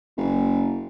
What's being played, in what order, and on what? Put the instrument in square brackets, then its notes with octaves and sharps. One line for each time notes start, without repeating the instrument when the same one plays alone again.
[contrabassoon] F#1